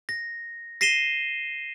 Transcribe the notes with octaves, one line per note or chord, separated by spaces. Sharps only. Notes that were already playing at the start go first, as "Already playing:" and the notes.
A#6
A#6 C7 D#7 E7 G7